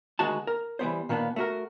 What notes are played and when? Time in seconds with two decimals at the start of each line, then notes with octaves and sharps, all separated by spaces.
0.19 D2 D#3 G#3 F#4 A5
0.47 A#4
0.79 E3 G3 B3 C5
1.09 A#2 D#3 A#3 B3 D4
1.36 A3 F#4 A#4